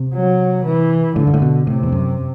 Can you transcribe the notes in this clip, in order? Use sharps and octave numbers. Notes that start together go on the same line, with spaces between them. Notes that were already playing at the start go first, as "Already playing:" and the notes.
Already playing: C3
F#3
E3
A2 D3
G2
A2
B2
A2 C3
E2
F#2